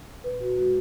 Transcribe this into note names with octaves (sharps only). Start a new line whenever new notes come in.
A#2 B4
F#4
G#3 F#4